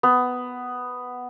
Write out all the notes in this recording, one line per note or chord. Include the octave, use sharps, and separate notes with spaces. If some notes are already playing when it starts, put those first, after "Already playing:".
B3